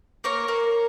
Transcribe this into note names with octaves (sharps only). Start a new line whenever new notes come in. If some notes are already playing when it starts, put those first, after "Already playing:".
A#3 A#4 C#5
A#3